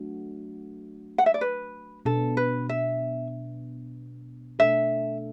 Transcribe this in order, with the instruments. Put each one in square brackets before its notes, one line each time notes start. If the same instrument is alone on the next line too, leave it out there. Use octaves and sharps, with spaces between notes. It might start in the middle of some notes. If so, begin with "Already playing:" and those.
Already playing: [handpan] F#3 A3 D4 F#4
[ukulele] F#5
E5
D5
B4
[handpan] B2 B3 D4 [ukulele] A4
[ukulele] B4
E5
[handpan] B2 A3 D4 A4 [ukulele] E5